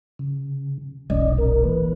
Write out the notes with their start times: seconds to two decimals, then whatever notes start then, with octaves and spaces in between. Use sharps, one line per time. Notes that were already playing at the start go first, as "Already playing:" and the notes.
0.19 C#3
1.10 E1 B1 C#4 D5 D#5
1.38 A#2 A#4
1.64 E3 A#3 B4